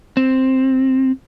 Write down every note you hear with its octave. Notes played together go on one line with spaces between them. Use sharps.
C4